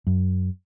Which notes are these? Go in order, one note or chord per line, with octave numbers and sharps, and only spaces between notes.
F#2